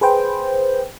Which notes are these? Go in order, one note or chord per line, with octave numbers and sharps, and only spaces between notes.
G#4 B4 C5 G5